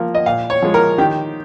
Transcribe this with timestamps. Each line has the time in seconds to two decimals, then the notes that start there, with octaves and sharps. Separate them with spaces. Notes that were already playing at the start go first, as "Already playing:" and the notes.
Already playing: F3 A#3
0.15 D#5
0.26 A#2 F5
0.50 C#5
0.62 F3 G#3
0.74 A#4
0.98 D#3 G4